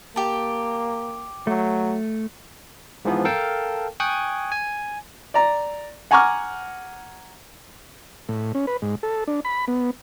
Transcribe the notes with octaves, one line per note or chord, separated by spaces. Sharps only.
A#3 G4 A5
F#3 A3
G#2 E3 F3 B3
A4 A#4 F5 G5 A5
G5 G#5 C#6 D#6 F#6 G#6
G#5
D5 A#5
F#5 G#5 A#5 C#6 D6 F6
A2
C#4
B4
G#2
A4
D4
B5
B3